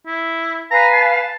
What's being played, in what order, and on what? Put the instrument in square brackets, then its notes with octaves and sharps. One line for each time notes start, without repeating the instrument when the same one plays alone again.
[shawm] E4
[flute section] B4 F5 G#5 [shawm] A#5
[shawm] A5